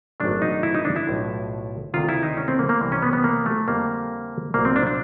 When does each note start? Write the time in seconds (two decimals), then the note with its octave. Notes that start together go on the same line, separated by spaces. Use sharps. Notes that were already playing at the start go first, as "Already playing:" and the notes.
0.20 G#1 F#2 D#3 F#3 A3 D4
0.42 D#4
0.63 E4
0.75 D#4
0.85 D4
0.96 E4
1.07 B1 A2 F3 A3
1.94 D2 C3 D#3 F4
2.09 E4
2.23 D#4
2.37 C#4
2.48 C4
2.59 A#3
2.69 A#3
2.81 C2 C3 E3 G3
2.92 C#4
3.02 B3
3.13 B3
3.24 A#3
3.46 A3
3.68 F2 D3 G3 A#3
4.54 C2 A#2 F#3 A#3
4.65 C4
4.76 D4
4.87 D4